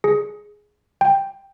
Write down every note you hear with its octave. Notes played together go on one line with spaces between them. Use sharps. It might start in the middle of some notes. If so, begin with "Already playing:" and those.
G#4
G5